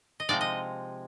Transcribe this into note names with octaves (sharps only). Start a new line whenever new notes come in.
D#5
C3 F3 G#3 C4 D#4 D5
D#5